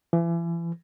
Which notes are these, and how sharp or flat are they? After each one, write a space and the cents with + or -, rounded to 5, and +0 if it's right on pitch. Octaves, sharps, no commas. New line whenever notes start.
E3 +35